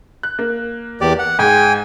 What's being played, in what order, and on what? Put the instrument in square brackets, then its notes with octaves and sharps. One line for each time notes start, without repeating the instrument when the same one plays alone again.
[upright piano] F#6
A#3
[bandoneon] E2 G4 D5
F#5
[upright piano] G#2 G#3 [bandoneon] G5 G#5